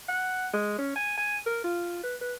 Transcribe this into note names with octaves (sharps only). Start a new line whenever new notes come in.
F#5
G#3
C#4
G#5
G#5
A#4
F4
B4
B4